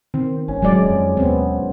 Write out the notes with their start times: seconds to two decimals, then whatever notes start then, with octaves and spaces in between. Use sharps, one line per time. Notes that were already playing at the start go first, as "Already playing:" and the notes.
0.14 D#3 C4
0.48 G#1 C#4
0.62 D1 F#3 G#3 D5
0.89 F2
1.17 D#2 B3 C4